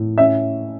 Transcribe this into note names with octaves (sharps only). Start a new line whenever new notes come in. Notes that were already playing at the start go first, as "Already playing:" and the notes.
Already playing: A2
C#4 E5